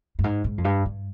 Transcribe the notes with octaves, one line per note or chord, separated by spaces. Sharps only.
G2
G#2
G#2
F2
G2
G2